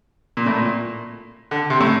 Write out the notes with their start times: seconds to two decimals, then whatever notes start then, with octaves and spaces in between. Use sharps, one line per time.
0.37 A#2
0.46 A2
0.55 A#2
1.51 D3
1.70 C3
1.80 A2